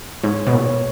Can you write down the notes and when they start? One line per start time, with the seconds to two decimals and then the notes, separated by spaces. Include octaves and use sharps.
0.23 G#2 C#5
0.47 B2
0.53 A#2 C#5